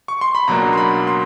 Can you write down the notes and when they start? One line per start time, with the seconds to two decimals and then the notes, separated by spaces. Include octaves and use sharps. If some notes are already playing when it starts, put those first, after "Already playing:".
0.08 C#6
0.21 C6
0.35 B5
0.47 C#2 B2 F#3 A#3 D4 A#5
0.73 C6
0.77 B5
1.07 C6